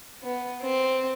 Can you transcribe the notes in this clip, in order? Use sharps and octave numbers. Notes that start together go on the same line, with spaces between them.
B3
C4